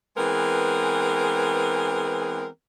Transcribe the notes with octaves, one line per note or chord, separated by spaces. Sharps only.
E3 G#3 B3 C4 G#4 A#4